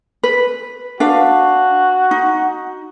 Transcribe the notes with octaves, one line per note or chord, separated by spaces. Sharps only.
B4
D4 F#4 B4 F5
D#4